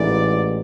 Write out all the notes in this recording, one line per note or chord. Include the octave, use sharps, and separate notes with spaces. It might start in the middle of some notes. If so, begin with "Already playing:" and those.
Already playing: A1 G#2 E3 D5